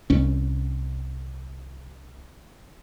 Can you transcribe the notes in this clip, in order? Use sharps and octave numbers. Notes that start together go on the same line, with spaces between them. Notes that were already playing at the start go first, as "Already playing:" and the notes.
C2 C#4